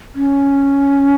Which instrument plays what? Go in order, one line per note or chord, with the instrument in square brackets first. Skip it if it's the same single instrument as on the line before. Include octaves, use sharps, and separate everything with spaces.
[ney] C#4